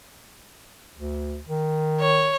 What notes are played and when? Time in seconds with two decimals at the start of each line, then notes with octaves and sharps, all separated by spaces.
0.97 D2
1.49 D#3
2.00 C#5